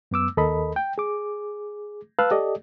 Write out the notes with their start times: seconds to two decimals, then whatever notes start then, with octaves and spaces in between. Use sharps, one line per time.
0.11 F#2 B3 D6 E6
0.37 D#2 A4 A#4 D#5 B5
0.76 G5
0.98 G#4 D6
2.19 B4 F5 A5 E6 F#6
2.31 G4 A4 D5 D#5